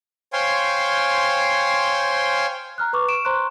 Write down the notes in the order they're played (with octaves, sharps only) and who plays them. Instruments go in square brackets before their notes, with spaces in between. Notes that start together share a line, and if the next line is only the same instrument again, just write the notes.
[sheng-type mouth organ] C5 C#5 F5 G5 G#5 C6
[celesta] A#5 F6 F#6
B4 C#6 D6
C#6 D7 E7
C5 A#5 C6 C#6 F#6